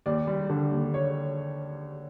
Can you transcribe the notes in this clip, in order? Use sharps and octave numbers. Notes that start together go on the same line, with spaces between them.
D#2 D5
G3
D3
D#2
C#5